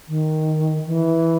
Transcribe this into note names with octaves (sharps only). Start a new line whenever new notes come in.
D#3
E3